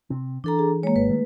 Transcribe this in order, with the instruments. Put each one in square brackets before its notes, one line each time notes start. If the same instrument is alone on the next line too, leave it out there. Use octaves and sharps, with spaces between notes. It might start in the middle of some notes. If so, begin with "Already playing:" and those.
[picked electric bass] C3 C4
[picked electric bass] E3 [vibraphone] D4 A4 A#5
[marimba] G#4
[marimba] G#3 A#3 [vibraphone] C#5
[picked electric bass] G#1 [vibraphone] B4
[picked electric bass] D#3 A3